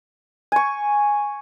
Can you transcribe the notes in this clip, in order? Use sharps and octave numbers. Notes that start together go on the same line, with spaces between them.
G#5 C#6